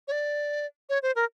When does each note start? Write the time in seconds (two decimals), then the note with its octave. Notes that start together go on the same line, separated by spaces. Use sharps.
0.08 C#5
0.12 D5
0.89 C#5
1.03 C5
1.16 A#4